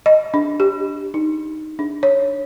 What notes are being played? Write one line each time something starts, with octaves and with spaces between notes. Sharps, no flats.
D#5
D4
G4
D#4
D4
C#5